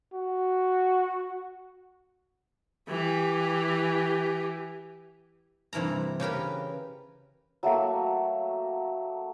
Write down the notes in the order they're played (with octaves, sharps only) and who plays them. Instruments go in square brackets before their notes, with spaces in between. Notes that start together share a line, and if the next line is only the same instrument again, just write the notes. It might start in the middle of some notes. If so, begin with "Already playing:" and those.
[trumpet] F#4
[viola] E3 G4
[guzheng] G2 C3 E3 A#4 A#5
C#3 G4 A#4 B4
[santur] F#3 A3 A#3 F#4